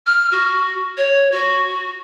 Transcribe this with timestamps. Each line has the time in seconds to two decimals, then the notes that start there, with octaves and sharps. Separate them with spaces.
0.06 F6
0.31 F#4
0.97 C#5
1.31 F#4